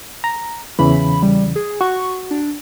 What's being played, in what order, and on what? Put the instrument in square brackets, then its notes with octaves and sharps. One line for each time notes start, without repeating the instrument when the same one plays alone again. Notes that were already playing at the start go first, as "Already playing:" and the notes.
[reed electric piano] A#5
[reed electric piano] E2 C#3 E3 [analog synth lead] B5
[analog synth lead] G3
G#4
[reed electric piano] F#4 [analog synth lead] C#6
[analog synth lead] D4